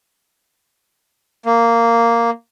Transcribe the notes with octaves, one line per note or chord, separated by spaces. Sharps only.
A#3